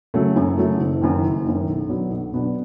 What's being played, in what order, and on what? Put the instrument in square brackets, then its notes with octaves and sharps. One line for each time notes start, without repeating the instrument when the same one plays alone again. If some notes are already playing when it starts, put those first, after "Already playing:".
[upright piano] C#3 F#3 A3
F#2
C#3 F#3 A3
F#1
F#2 D#3
F#1
F#2 D#3
B1
B2 F#3 B3 D4
B1
B2 F#3 B3 D4